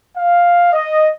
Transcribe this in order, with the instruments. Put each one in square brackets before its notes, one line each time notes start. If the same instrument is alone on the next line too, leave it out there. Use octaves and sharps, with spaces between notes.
[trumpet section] F5
D#5